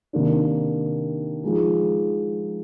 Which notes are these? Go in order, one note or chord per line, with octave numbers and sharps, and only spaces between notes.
C3 D#3 A#3 D4
F3 G#3 D#4 G#4